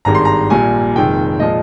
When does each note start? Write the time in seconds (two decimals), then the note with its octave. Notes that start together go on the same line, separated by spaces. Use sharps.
0.05 G#1 G2 D#3 G#3 A#5
0.15 C6
0.25 A#5
0.50 A#1 A#2 G3 G#5
0.95 F1 F2 D#3 G#3 G5
1.40 A#2 F3 G#3 D#5